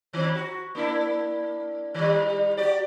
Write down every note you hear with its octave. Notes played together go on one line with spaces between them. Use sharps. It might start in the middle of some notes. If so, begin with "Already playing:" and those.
D#3 C4
F#4
A#3 D4 E4
D#3 G3
F#4 G4 D5